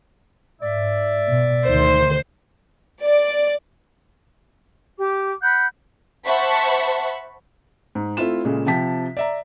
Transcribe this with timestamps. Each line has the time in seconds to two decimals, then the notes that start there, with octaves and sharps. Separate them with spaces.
0.60 G#2 D5 E5
1.25 B2
1.67 D2 D#3 C5
3.05 D5
4.98 G4 D6
5.41 F#5 B5 F#6 G6
6.26 C5 E5 F#5 A5 B5 C#6
7.95 G#2
8.17 A3 C4 E4 F4 E7
8.45 A#2 C#3 G#3 A3
8.67 C3 F3 G5 A5 B6
9.17 D5 E5 A#5